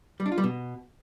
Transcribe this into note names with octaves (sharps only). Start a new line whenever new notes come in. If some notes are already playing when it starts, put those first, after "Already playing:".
G3
D4
F4
G3
B2